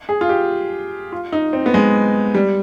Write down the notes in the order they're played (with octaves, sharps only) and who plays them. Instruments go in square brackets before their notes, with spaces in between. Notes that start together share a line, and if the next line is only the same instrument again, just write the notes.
[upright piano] G#4
F4
G4
F4
D#4
C4
B3
G#3
G3